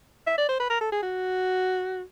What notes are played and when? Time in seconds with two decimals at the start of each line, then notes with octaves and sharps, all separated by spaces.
0.27 E5
0.38 D5
0.49 C5
0.60 B4
0.70 A#4
0.81 A4
0.92 G#4
1.03 F#4